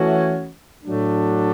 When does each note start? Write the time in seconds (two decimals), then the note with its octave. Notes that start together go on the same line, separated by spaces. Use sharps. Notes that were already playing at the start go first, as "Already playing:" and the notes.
Already playing: E3 A3 C#4 F#4
0.84 A2 F#3 A3 D4